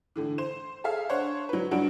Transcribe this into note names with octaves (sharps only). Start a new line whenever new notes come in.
A2 D3 E3
C5 E7
G#4 A4 E5 F5
D4 C5 C#5 F#5
F#3 B4
G2 F#3 D4 F#4 D7